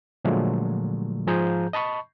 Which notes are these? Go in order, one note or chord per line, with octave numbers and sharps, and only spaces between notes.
A#2 D3 F3 F#3 G#3 A3
G#2 F3 G#4 A#5 G6
D#5 A5 B5 C#6